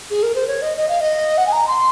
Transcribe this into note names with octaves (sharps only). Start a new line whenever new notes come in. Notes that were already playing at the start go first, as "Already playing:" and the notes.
G#4
A#4
C5
C#5
D#5
D#5
F5
D#5
F#5
G#5
A#5
C6